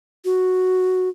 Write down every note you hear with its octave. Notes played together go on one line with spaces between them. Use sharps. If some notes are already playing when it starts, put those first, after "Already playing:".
F#4